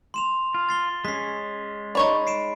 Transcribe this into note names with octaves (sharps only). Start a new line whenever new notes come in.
C6 E7 F7
F4
A6 C7 G7
G#3 C#4 B6 C7
D#4 C#5 D5 B5
C7 D7 E7